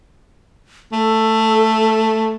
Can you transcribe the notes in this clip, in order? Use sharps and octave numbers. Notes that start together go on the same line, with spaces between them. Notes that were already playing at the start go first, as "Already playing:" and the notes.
A3 A4